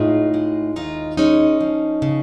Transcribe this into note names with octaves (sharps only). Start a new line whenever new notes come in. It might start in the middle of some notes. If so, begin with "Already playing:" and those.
Already playing: A2 G#3 D#4 F4
G#3
D#2 D#4 F4
G#3 C#4 D#4
F3
C#3